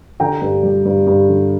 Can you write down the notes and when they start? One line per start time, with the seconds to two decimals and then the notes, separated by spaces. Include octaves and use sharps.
0.20 D3 G5 A#5
0.42 G2
0.63 G3
0.85 G2
1.07 G2
1.29 D3